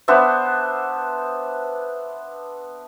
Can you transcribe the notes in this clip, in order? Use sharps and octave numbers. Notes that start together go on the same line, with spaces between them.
B3 D4 C5 E5